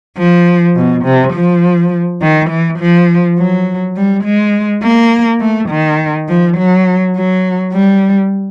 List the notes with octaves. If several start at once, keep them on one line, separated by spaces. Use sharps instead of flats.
F3
B2
C3
F3
D#3
E3
F3
F#3
G3
G#3
A#3
A3
D#3
F3
F#3
F#3
G3